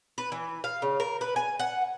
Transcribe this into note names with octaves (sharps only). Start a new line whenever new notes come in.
B4
E3
F5
C#3
A#4
B4
G#5
F#5